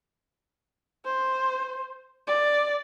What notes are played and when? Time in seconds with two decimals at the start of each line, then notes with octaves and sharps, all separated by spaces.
1.06 C5
2.27 D5